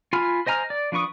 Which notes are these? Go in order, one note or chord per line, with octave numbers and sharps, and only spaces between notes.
F4 G#5 B5 F6
C5 D#5 G#5 A#5 F6
D5
F3 D4 B4 C#6 D#6